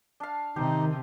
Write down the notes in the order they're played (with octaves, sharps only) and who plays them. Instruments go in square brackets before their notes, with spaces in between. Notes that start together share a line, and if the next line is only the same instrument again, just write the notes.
[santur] D4 F5
[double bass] C3 [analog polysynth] D#3 [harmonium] D#4 [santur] G4